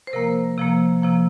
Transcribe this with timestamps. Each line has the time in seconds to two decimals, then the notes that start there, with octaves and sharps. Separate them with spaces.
0.07 C5
0.13 C3 F3 A#3 A#4
0.58 C3 F3 A#3
1.02 C3 F3 A#3